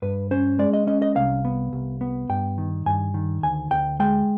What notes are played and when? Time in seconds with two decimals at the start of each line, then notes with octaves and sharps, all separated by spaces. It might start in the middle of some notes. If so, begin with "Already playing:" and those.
0.02 G2 B4
0.31 C#4 C5
0.59 G#3 D5
0.73 D#5
0.87 C#4 D#5
1.02 D#5
1.16 C2 F5
1.45 B3
1.73 C2
2.01 B3
2.29 G2 G5
2.58 D#3
2.86 G2 G#5
3.14 D#3
3.43 D2 G#5
3.71 D2 G5
4.00 G#3 G5